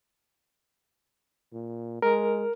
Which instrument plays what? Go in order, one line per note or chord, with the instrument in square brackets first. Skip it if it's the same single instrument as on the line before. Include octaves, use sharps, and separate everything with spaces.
[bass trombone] A#2
[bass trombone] G#3 [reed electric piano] A#4